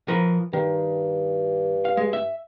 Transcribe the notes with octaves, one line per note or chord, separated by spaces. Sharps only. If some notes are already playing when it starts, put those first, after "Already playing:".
F3 A#4 B4
G2 D#3
F5
G#3
E5